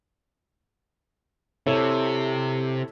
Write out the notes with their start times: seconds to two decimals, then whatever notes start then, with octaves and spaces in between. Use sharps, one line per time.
1.67 C3 E4 A4 C#5